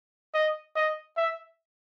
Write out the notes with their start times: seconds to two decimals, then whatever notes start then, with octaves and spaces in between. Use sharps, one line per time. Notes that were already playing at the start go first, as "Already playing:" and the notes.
0.34 D#5
0.76 D#5
1.17 E5